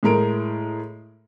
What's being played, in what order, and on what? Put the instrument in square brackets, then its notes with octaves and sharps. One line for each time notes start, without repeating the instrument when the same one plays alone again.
[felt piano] A2 G#3 A#4 D7